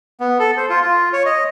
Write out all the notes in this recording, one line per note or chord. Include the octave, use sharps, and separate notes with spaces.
B3
A4
C5
F4
F4
C#5
D#5